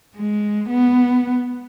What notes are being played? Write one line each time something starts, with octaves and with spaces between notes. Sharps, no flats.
G#3
B3